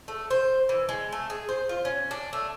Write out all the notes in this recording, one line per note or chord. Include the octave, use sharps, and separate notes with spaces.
A3
C5
E3
G#3
A3
G#4
C5
F4
C#4
D4
A3